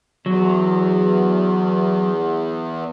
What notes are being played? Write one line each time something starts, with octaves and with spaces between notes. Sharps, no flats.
E2 F#3